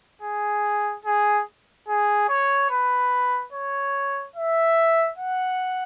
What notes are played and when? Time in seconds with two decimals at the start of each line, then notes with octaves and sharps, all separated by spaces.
0.22 G#4
1.05 G#4
1.88 G#4
2.29 C#5
2.70 B4
3.52 C#5
4.36 E5
5.18 F#5